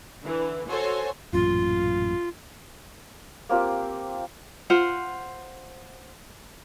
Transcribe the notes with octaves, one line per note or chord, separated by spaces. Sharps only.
D3 E3
F#4 A4 C5 C#5 G#5 C6
A1 F#2 A#2 F4
A#3 C4 F4 G4
F4 C5 F#5